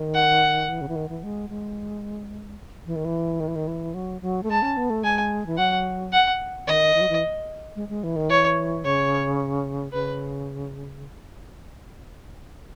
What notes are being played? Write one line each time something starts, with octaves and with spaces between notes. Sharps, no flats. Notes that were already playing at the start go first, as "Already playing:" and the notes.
Already playing: D#3
F#5
E3
C#3
E3
D#3
E3
G#3
G#3
E3
D#3
E3
D#3
E3
D#3
E3
F#3
F#3
A3
G#3 A5
C#4
B3
A3
G#3 G#5
E3
F#3 F#5
F#5
D#3 D#5
E3
F#3
E3
G#3
G#3
E3
D#3
E3 C#5
C#3 C#5
C#3 B4